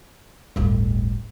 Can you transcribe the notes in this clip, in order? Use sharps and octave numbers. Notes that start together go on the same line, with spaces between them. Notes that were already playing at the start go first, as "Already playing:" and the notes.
D1 G1